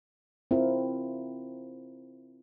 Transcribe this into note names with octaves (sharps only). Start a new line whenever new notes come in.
C4 E4 F4 A#4